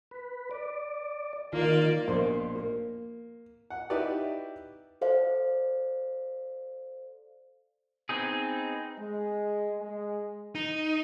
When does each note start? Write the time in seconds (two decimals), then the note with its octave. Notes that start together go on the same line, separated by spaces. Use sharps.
0.11 B4
0.51 D5
1.53 D#3 A#3 F4 D5
2.08 A#1 B2 A#3 C5 C6
2.55 A#3
3.70 F#5
3.90 D#4 E4 F#4 G4 B4 D5
5.01 A4 C5 D5 F5
8.09 B3 C4 D#4 G#4
8.98 G#3
9.79 G#3
10.55 D#4